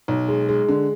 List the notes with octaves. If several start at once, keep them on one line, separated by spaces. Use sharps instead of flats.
B1
G#3
G#3
D3